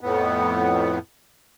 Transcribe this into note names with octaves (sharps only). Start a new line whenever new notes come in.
F2 A2 B3